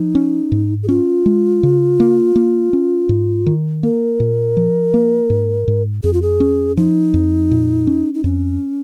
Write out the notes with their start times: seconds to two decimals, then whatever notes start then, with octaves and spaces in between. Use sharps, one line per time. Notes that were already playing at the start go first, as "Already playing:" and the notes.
Already playing: F3 D#4
0.15 C#4
0.52 G#2
0.83 G#4
0.88 C#4 F4
1.26 G#3
1.63 C#3
2.00 A#3
2.36 A#3
2.73 C#4
3.09 G#2
3.46 D#3
3.83 A#3 A#4
4.20 A#2
4.57 F3
4.94 A#3
5.30 G#2
5.68 G#2
6.04 F2 G#4
6.13 F4
6.22 G#4
6.40 C#4
6.77 F3 D#4
7.14 F2
7.51 A#2
7.87 C#4
8.14 D#4
8.24 F2 C#4